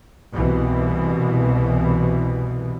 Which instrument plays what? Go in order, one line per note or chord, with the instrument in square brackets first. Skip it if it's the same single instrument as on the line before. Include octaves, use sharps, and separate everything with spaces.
[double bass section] C2 B2 E3